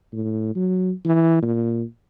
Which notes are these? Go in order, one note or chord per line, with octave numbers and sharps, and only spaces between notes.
A2
F#3
E3
A#2